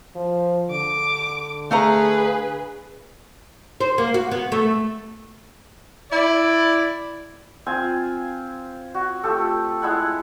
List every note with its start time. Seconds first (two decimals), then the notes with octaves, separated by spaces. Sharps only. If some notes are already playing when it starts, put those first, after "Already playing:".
0.15 F3
0.70 D3 D6
1.71 A3 G#4 B4 F5 A#5
3.81 C5
3.98 A#3
4.14 F#4
4.31 B3
4.52 A3
6.12 E4 D5
7.66 C4 F4 G#5
8.94 F#4
9.23 A3 F4 G4 A4
9.82 G#3 E4 F#5